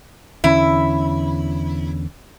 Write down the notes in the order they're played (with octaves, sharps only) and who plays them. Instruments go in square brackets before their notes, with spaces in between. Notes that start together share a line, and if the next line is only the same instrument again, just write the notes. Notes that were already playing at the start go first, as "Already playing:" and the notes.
[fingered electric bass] E2 D3 C#4 [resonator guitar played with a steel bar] E4